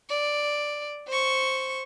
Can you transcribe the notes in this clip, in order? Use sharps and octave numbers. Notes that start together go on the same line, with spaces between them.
D5
C5 C#6